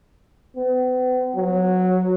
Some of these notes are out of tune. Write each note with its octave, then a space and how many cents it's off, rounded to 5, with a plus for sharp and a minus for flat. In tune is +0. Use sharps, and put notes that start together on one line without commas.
B3 +45
F#3 -10